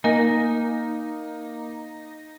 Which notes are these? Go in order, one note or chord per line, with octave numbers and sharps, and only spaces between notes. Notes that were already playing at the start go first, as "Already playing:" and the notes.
A#3 D#4 A#4 D#5 G#5